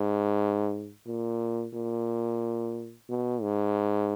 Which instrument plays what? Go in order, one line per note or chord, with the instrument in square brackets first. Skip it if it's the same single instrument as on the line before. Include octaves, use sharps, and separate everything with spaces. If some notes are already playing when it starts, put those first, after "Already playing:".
Already playing: [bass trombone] G#2
A#2
A#2
B2
G#2